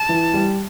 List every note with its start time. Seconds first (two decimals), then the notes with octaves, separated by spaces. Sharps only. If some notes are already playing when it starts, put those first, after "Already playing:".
Already playing: A5
0.09 E3
0.34 G3